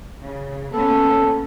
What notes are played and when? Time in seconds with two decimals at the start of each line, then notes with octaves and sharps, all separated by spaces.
0.21 C#3
0.75 A#3 B3 C#4 A4